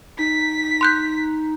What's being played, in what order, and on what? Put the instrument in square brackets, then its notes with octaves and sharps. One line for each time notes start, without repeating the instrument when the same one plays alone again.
[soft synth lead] D#4 [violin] B6
[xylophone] C6 F#6 G6